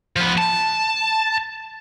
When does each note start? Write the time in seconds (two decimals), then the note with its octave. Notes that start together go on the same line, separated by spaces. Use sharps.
0.16 F3 B3
0.38 A5